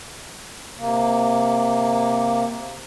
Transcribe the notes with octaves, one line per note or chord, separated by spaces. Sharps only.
C3 A#3